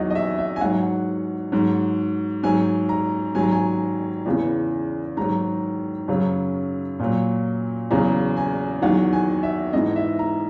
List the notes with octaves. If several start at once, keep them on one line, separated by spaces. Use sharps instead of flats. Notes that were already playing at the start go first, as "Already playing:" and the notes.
Already playing: E2 D#3 F#3 D#5 F#5
D#5
E5
E5
G#5
G#2 F#3 F#5
G#2 F#3
G#2 F#3 G#5
A#5
G#2 D#3 F#3 G#5
A#5
G#5
E2 C#3 E3
G#2 D#3 F#3 A#5
F#2 C#3 F#3
A#2 F#3
E2 C#3 F#3 A#5
G#5
E2 D#3 F#3 F#5
G#5
E5
G#2 E3 D#5
E5
A#5